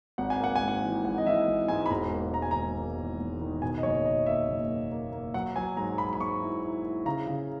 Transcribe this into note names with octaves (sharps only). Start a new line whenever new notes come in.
G#1 F#5
G#5
A#3 F#5
G#5
G#2
F#5
E3
G#1 F#5
D#5
E3 E5
G#1
G#2 G#5
B5
E1 A#5
A#3
E1 A#5
G#5
D#3 A#5
A#3
E2
E1
D#3
B2 G#5
D#5
F#1 C#5
F#1 D#5
A#3 E5
F#1
A#3
A#3
A#3
F#3 F#5
F#3 G#5
G#2 A#5
F#3 B5
B5
G#2 C#6
E4
E4
E4
C#3 A#5
C#3